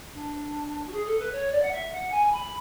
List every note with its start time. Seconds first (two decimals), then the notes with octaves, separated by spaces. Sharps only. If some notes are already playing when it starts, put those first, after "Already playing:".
0.14 D4
0.87 F#4
0.93 G#4
1.06 A4
1.19 B4
1.32 C#5
1.52 D5
1.62 F#5
1.71 E5
1.92 F#5
2.11 G#5
2.32 B5